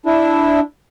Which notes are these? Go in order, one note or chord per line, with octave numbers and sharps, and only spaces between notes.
D4 E4